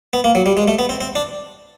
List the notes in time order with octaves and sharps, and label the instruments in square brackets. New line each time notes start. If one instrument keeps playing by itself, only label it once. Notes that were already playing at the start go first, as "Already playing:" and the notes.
[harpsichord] B3
A#3
F#3
G3
G#3
A3
B3
C4
C4
D4